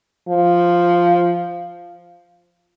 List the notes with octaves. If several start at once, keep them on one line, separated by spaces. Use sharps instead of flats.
F3